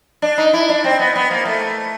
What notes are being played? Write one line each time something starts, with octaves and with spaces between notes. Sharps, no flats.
D4
D#4
E4
D4
C4
B3
B3
A#3
A3